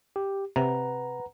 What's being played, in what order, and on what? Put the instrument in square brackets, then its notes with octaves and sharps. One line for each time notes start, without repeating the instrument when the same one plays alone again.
[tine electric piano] G4
[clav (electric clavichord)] C3 [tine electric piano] B4 F#5 A#5